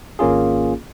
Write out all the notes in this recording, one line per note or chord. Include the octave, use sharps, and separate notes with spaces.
G#1 A#3 C#4 F4 G#4